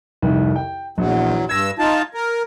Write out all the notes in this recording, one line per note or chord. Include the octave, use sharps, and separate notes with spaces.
C2 F2 D#3
G5
A#1 E2 F#3
G2 E6 G#6 A#6
D#4 F4 A5
A#4